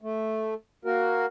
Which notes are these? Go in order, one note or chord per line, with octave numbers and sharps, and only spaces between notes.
A3
A#3 F#4 A#4